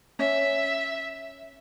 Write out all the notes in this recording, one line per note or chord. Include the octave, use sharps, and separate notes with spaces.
C#4 E5